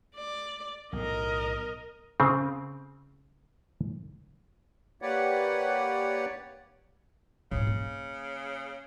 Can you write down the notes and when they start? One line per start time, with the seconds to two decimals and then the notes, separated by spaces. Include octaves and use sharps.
0.15 D5
0.93 B1 A2 A#4 D#5
2.20 C#3 C4
5.02 A#3 G4 B4 C#5 D5 F#5
7.52 G#2 C#3 E3
7.67 A#3